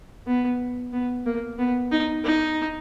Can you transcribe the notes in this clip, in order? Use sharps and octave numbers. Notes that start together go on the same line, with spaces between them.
B3
B3
A#3
B3
D#4
D#4